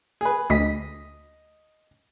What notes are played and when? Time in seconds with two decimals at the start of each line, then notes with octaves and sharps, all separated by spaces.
0.21 G#4 B4
0.50 D2 D#5 B6